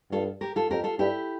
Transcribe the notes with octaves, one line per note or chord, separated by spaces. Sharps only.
G2 F4 A4
G4 A#4
F4 A4
F2 G4 A#4
F4 A4
G2 E4 G4